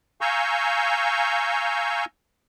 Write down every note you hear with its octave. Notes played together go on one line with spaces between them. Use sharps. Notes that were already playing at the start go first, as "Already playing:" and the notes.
F5 G#5 A#5 C#6 E6 G6